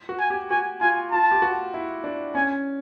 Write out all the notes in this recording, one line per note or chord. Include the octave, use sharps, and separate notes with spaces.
F#4
G#5
G4
F#4 G#5
F4 G#5
F4 A5
G4
F#4
E4
D4
C#4 G#5